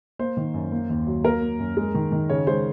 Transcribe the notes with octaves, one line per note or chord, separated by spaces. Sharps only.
A#3 C5
D#3
F#2
A#3
D#2
F#3
A#3 A#4
A#3
F#2
G#3
D#3
D#3
C#3 C#5
G#3 C5